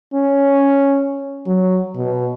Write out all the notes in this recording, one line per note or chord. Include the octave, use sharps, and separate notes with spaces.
C#4
F#3
B2